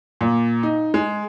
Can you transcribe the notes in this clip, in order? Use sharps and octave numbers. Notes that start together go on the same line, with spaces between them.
A#2
D#4
G#3